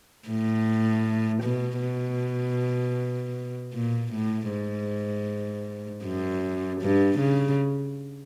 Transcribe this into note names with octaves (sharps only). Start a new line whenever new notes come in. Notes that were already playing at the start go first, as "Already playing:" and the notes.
A2
B2
B2
A#2
A2
G#2
F#2
G2
C#3